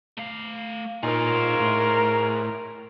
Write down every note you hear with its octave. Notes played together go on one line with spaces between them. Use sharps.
A3 F5
A#2 D#4 F4 G#4 A#4 C5 C#5 C6
A2